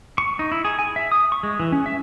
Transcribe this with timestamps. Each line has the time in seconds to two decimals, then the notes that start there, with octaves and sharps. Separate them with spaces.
0.18 C#6
0.39 D#4
0.52 E4
0.65 G#4
0.79 G#5
0.96 E5
1.12 D#6
1.32 C#6
1.43 G#3
1.60 E3
1.72 C#4
1.86 E5